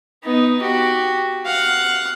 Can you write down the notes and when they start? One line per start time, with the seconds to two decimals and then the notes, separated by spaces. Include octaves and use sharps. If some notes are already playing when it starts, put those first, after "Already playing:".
0.24 B3 D#4
0.61 F#4 G4
1.46 F5 F#5